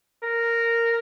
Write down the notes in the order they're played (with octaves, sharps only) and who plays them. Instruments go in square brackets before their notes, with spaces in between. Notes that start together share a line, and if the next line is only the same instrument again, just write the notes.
[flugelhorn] A#4